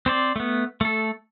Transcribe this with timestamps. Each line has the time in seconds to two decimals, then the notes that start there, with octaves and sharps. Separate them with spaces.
0.06 C4 C5 D5
0.36 A3 B3
0.81 A3 A4